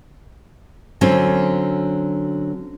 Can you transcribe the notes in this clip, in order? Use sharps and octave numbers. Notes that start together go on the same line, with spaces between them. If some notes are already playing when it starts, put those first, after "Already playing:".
D3 F#3 C4 C#4